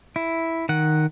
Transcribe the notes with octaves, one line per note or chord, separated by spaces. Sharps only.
E4
D#3 F#5